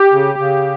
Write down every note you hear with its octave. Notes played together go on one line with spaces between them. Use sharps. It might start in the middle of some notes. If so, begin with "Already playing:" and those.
Already playing: G4
C#3
C#3